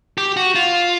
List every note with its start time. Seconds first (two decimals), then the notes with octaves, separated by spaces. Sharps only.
0.18 G4
0.37 F#4
0.55 F4